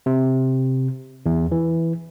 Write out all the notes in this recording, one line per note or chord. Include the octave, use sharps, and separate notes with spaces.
C3
E2
E3